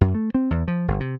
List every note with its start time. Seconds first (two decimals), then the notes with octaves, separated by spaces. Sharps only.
0.01 F#2
0.15 A3
0.34 C4
0.51 E2
0.68 F3
0.88 G1
1.00 C3